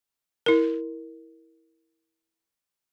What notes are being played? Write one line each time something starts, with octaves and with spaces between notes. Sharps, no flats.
E4 A#4